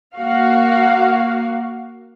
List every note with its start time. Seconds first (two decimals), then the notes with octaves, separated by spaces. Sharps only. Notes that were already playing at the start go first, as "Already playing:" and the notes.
0.16 A#3 F#4 F5